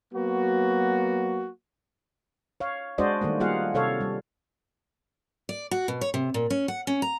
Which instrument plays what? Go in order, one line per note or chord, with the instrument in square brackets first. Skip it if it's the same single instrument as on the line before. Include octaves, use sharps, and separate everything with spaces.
[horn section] F#3 A#3 B3 F#4
[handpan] C#5 F5
G#3 D4 F#4 C5 D5 D#5
D#3 G3 A3 A#3
G3 A#3 F4 G#4 F5 F#5
C3 A4 C#5 F5
G3
[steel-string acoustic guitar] D5
F#4
B2
C#5
C3
A#2
C#4
F#5
C#4
A#5